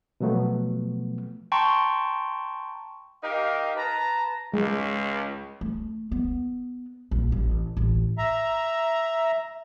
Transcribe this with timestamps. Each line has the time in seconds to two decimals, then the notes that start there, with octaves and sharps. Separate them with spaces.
0.20 B2 F3 F#3 A3 B3
1.52 G5 A5 A#5 C6 C#6
3.23 D#4 G4 A#4 F5
3.76 B4 A5 A#5
4.54 C#2 G#3
5.61 A3
6.12 B3
7.11 A#1
7.32 A1
7.77 A1
8.18 E5 A#5